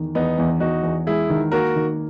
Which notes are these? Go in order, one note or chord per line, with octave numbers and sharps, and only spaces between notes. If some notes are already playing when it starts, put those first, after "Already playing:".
Already playing: E2 D#3
E2 B3 D#4
E2
E2 D#4 F#4
E2
G#3 E4 G#4
D#3
A#3 F#4 A#4
D#3